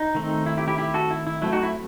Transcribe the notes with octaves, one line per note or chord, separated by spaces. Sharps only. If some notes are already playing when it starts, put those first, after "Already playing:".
Already playing: D#4
D#3 A3 C4
E4
E4 G4
E4 G4
E4 G4
F#4 A4
E4
E4
F#3 A3 C4 E4
D#4 F#4
E4